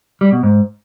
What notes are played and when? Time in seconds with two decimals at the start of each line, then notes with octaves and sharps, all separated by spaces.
0.21 G3
0.32 B2
0.43 G#2